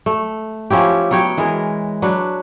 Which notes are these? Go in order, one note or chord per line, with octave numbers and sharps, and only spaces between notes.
A3
F3 C#4 E4 G4
F#3 B3 C#5 G5
E3 G#3 G#4 A#4
F#3 D4 B4